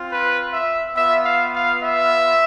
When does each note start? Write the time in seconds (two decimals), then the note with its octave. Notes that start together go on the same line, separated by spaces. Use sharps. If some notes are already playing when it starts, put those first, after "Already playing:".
Already playing: C4 F4
0.10 B4
0.53 E5
0.96 B3 F4 E5
1.25 F5
1.55 F5
1.84 E5